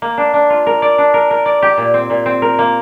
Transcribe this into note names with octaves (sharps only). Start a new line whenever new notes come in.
A#3
D4
D4
F4
A#4
D5
D4
A#4
A#4
D5
G4
A#2
C4
A#2
C4
A#4
A#3